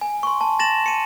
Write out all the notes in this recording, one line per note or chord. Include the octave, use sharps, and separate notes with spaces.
G#5
C6 C#6
A5
A6 A#6 E7 F#7
C#7 D#7